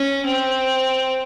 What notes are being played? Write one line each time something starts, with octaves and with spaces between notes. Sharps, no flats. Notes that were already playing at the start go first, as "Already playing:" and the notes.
Already playing: C#4
C4